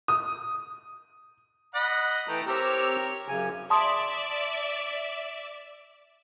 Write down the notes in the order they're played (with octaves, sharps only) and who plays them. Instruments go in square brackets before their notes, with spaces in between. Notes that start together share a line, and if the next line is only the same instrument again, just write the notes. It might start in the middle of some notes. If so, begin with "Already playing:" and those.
[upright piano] D#6
[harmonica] D#5 F#5 B5
[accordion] E3 G5 [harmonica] A3 A#5
[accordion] C4 G4 E6 [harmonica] A#4 C#5
[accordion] F#2 C#3 G#5
[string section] D5 E5 [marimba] A5 C6 D#6